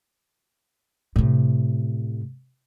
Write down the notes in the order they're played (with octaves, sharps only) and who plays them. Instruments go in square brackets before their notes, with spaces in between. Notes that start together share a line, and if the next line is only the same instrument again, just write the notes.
[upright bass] A2 C3